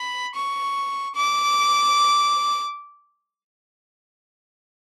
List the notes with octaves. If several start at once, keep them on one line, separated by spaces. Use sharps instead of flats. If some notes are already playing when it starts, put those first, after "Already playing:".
Already playing: B5
C#6
D6